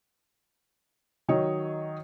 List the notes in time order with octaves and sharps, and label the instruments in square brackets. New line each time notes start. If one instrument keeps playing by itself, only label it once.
[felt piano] D#3 F#3 C#5 D#5